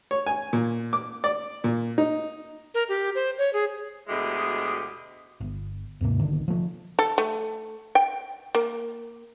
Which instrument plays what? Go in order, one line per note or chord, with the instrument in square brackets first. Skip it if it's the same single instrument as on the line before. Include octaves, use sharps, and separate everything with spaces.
[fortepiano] C#5
G#5
A#2
D6
D5
A#2
D#4
[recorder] A#4
G4
C5
C#5
G#4
[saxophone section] D2 B2 G#3 E4 G4 D#5
[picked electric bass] G1
D#2 G#2 C3 A#3
B1 D3 D#3
F3 A3
[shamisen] A4
A3
G5
A#3